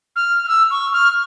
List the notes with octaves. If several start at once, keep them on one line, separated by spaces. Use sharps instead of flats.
F6
F6
E6
C#6
F6